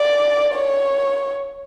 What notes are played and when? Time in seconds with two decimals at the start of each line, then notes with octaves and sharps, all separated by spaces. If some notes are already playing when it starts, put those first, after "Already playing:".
Already playing: D5
0.55 C#5